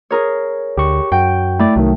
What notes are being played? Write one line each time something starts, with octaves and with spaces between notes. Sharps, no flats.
G#4 A#4 C#5
D2 G4 C#6
F#2 F#4 G5
A3 E4 D5
C2 D#3 F#3